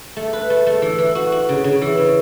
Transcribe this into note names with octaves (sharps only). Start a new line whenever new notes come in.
A3
B4
A3
A3
E3
E3
F#4
F#4
C#3
C#3
E3
C#3